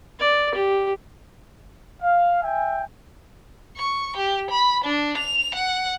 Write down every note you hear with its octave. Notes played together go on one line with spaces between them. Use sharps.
D5
G4
F5
E5 G5 G#5
C#6
G4
B5
D4
F7
F#5